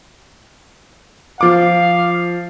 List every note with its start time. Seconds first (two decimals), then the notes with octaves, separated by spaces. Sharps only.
1.41 F3 F5 D6